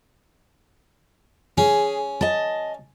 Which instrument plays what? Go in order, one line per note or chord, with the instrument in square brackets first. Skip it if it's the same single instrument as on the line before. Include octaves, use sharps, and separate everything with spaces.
[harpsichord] C#4 [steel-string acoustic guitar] G#4
[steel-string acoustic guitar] D#5 A5